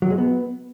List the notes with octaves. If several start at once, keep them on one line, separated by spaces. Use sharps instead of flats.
F#3
G#3
B3